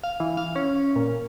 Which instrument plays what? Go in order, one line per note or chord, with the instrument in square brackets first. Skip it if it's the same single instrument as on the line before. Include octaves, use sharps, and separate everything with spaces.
[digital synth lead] F5
E3
F5
C#4
A#2